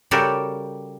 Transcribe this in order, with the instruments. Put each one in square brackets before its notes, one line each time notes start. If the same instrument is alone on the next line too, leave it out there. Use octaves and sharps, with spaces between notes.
[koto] C#3 G3 F#4 G4 A4 A#4